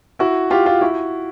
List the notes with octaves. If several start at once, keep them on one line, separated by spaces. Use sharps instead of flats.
E4 F#4
F4 G4
F4
E4 F#4